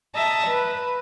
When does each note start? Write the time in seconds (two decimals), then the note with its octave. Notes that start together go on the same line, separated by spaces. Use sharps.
0.15 D#5 E5 A5 A#5
0.48 B4